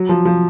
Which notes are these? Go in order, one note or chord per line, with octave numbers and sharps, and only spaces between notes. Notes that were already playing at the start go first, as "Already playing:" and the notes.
Already playing: F#3
F3
F3